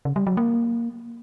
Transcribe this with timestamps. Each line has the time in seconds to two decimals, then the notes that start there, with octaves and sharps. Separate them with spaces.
0.05 C#3
0.16 G3
0.27 F#3
0.37 A#3